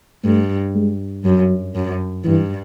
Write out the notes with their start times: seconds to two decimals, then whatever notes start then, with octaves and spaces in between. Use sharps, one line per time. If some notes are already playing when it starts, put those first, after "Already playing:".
0.24 G2 A3
0.75 G#3
1.25 F#2 F#3
1.75 F#2
2.24 G2 E3